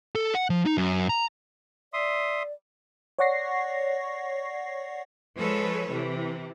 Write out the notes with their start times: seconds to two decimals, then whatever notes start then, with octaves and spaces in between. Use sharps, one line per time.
0.15 A4
0.35 F#5
0.50 F3
0.66 D#4
0.78 F#2
1.09 A#5
1.93 D5 E5 C6 D#6
3.19 C#5 D5 F#5 C#6 A#6 C7
5.38 F3 G#3 A4 B4 C#5
5.92 C3 E3